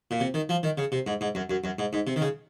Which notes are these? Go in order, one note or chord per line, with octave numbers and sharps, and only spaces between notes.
A#2
C3
D#3
F3
D#3
C#3
C3
G#2
G#2
F#2
F#2
F#2
G#2
G#2
C3
D#3
C#3